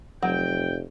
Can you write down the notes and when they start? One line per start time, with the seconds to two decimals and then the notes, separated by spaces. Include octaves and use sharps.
0.22 F1 F#3 G5